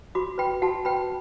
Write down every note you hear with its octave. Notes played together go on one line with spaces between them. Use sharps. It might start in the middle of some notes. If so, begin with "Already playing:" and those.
F#4 B5 D6
B4 G5 B5
F#4 F#5 A5
B4 G5 B5